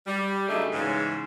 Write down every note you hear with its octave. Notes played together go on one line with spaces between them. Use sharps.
G3
C#3 F#3 A3 D4 D#4 G#4
G#2 C#3 E3